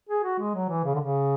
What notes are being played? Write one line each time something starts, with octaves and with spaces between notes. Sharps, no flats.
G#4
F#4
G#3
F#3
E3
C#3
D3
C#3